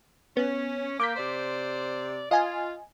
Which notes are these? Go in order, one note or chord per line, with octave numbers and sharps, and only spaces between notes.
B3 C#4
A#3 D6 G6 B6
C3 C5 D5
F4 D#5 F5 G#5